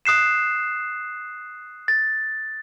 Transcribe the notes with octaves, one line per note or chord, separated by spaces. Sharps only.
D#6 F#6 C7 E7
A6